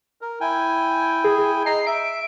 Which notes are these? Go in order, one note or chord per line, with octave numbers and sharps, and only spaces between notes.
A#4
E4 G5 G#5
G#4
D#5 A#5 C7
E5 D7